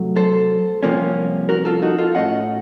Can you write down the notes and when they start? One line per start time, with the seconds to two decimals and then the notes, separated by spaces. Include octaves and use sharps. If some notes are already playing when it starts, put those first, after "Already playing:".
Already playing: C3 F#3 A3
0.16 A4 C5
0.83 C2 C3 F3 A#3 C#4
1.49 F#4 A#4
1.65 F4 A4
1.82 D#4 F#4
1.98 F4 A4
2.15 A2 A3 C#4 D#5 F#5